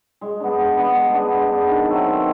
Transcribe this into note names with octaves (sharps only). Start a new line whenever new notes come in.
G#3
B3 D4
G#3
B3 D4
G#3
B3 D4
G#3
B3 D4
D#3
F#3 A3 C4
D#3